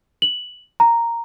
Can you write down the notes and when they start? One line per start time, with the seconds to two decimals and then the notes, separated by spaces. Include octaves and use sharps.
0.22 F#7
0.80 A#5